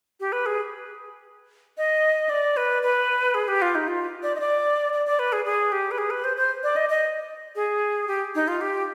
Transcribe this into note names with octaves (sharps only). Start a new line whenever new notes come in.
G4
B4
G#4
D#5
D5
B4
B4
G#4
G4
F4
D#4
F4
D5
D#5
D5
D5
D5
B4
G#4
G#4
G4
B4
G#4
B4
C5
C5
D5
D#5
D#5
G#4
G4
D#4
F4
G4